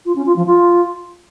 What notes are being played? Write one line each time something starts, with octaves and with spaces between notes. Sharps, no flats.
F4
C#4
F4
F3
F4